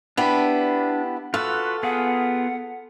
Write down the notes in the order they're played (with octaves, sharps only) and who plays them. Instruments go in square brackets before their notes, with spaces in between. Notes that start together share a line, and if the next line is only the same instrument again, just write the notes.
[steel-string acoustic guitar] B3 E4 G4 [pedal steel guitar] D4
[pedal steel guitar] F4 F#4 B4 [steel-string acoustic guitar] A4
[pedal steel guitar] B3 F4 G#4 [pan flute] F#5